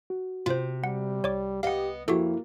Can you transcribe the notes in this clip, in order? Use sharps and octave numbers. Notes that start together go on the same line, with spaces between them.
F#4
C3 F4 C5
G3 F#5
C2 C#5 D5 D6
B3 G4 D#5 F5 F#5
F2 A#3 E4 F#4 G4 A4